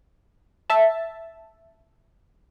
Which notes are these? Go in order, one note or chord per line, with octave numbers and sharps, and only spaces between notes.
E5 A5